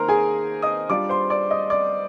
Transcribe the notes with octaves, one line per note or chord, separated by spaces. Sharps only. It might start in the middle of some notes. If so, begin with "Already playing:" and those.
Already playing: D#3 A#3 D#4 A#4 C5 A#5 C6
G#4 G#5
D#5 D#6
G3 D4 F4 D5 D6
C5 C6
D5 D6
D#5 D#6
D5 D6